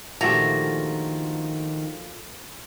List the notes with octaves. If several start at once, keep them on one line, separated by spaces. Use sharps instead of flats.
A#2 D3 D#3 F3 A3 F#4 G4 A#5